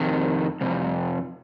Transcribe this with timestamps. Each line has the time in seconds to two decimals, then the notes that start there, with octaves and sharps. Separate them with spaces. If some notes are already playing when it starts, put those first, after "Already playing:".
Already playing: F2 C3 D#3
0.61 F2 C3 G3